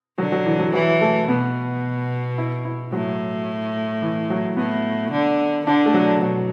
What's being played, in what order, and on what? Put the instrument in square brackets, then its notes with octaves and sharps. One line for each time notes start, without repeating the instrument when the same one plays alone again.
[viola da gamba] D3 [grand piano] F#3
[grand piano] F#3
E3
F#3
[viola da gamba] E3 [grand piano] F#3
[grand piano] A3
[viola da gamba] B2 [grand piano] B3
[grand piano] E4
E4
[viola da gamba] A2 [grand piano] F#3
[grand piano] E3
F#3
[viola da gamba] A2 [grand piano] B3
[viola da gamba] D3
[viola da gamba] D3 [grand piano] D4
[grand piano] A3
F#3
[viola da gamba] B2 [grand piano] F#3